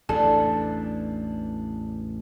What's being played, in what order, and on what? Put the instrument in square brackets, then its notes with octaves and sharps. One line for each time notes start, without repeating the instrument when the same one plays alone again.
[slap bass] A1 E2 A2 [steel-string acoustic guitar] D4 [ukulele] A4